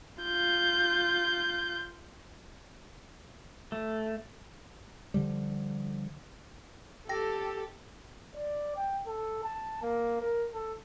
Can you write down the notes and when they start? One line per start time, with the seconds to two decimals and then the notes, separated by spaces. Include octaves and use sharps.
0.23 F4 G6
3.72 A3
5.14 D3 F3 G3
7.09 G4 A4 G5 A5 A#6
8.35 D5
8.77 G5
9.07 A4
9.43 A5
9.82 A#3
10.21 A#4
10.54 A4